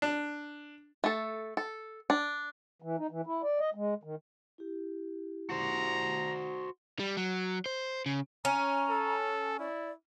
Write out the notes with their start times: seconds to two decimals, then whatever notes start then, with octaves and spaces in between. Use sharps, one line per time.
0.02 D4
1.04 A3 A4
1.57 A4
2.10 D4
2.82 E3
2.98 D#4
3.11 E3
3.26 E4
3.43 D5
3.59 D#5
3.75 G#3
4.03 D#3
4.58 E4 G4
5.50 F#4 C5 A#5
6.99 G3
7.17 F#3
7.66 C5
8.06 C#3
8.45 C#4 A#5
8.90 A4
9.59 E4 D5